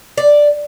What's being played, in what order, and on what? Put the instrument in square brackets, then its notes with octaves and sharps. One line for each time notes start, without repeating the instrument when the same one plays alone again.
[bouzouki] D5